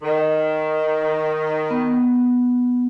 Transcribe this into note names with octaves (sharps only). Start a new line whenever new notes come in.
D#3
B3